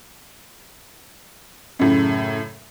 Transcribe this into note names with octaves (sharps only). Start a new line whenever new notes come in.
F#2 A2 C#3